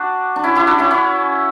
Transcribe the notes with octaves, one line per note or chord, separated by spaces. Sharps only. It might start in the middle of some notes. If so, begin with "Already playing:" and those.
Already playing: D4 F#4
D4
C#4 E4
E4 G4
D4 F#4
C#4 E4
C#4 E4